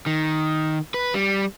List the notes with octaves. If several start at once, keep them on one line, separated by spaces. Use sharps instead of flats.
D#3
B4
G3